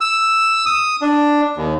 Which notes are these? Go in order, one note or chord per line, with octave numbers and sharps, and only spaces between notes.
E6
D#6
D4
D#2